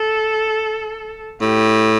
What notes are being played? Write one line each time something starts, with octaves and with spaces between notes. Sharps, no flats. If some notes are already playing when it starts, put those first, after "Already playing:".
Already playing: A4
A2 G4